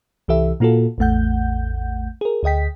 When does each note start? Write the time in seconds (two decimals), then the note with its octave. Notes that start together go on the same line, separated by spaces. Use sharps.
0.28 C2 E3 G4 A4 E5
0.60 A#2 A#3 F4 F#4 A4
0.98 A1 E2 A3 F#5 G6
2.21 G#4 A#4
2.43 D2 G#4 D#5 G5 B6